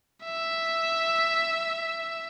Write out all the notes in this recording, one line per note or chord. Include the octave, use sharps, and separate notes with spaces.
E5